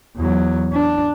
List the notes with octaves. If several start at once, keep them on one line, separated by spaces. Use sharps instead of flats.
E2 F#3
D4